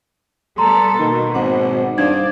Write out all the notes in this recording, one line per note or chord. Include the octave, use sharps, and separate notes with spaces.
G3 B3 A4 A#5 C6
B2 D#3 A#3
G#1 C5 F#5 D6
G2 D#4 C5 D5 F5 G#6